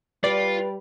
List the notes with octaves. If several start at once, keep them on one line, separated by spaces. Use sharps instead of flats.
G3 F4 B4 D5